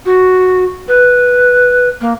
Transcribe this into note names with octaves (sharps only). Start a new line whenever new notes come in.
F#4
B4
A#3